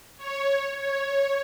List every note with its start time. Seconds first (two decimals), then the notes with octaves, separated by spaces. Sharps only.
0.17 C#5
0.78 C#5